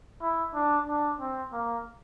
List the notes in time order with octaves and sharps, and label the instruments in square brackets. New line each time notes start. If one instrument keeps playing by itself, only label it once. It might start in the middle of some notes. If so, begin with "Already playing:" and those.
[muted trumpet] E4
D4
D4
C4
A#3